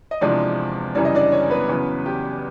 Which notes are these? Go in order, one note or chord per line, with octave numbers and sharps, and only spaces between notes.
D#5
E2 C3 F3 G#3 D4 D5
F#2 C#3 E3 G3 D5
D#5
D4 D5
C#4 C#5
B3 B4
E2 C#3 F#3
G4